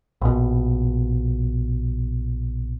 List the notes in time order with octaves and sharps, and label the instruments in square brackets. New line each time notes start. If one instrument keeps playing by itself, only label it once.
[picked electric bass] A#1 B2